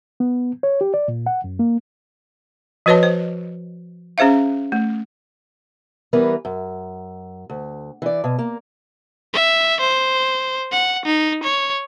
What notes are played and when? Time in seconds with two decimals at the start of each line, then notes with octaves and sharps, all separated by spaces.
0.20 B3
0.63 C#5
0.81 G4
0.94 D5
1.08 A#2
1.26 F#5
1.44 F#2
1.59 A#3
2.86 F3 F#4 B4 C#5 D#5 A5
3.03 C5
4.18 C#4 G#4 C5 E5 F5
4.72 A3
6.13 E3 G3 B3 A#4 B4
6.45 F#2
7.50 D2
8.02 E3 D5
8.24 B2
8.39 A#3
9.33 E5
9.80 C5
10.72 F#5
11.05 D#4
11.43 C#5